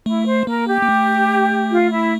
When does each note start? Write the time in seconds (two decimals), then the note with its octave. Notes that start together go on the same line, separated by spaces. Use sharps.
0.06 A3 E4
0.26 C5
0.47 A#3 A#4
0.68 G4
0.83 A#3
0.89 A3
1.71 F4
1.92 E4